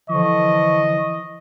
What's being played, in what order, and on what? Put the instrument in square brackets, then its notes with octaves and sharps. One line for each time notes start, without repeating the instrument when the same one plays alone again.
[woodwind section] D3 F3 [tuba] E3 [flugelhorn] D#5 [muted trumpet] C#6